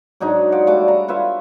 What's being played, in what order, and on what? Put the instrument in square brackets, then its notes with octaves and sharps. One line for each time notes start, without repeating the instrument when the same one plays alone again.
[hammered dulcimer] G#2 F#3 D4 D#4
F4 D5 F#5
G3 A3 F#4 D6
A#5
F4 B4 C#5 E5